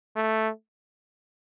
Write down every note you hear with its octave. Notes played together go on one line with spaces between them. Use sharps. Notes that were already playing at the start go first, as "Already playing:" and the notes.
A3